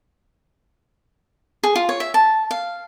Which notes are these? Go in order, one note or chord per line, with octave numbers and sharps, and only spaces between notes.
G#4
F4
C#5
E5
A5
F5